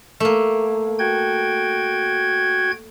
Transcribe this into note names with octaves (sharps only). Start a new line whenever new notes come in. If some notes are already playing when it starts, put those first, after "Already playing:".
A3 A#3
F#4 G5 G#6